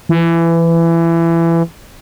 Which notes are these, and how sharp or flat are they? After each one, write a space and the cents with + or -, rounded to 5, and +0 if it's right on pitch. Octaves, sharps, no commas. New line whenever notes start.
E3 +20